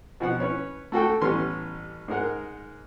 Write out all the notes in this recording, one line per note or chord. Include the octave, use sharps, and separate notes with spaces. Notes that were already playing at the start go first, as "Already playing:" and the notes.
B2 F3 F#5
C#4 B4 C#5
A3 F#4 A4 G5
A1 E3 G3 B3 C#4 C6
G#2 G#3 A#4 F#5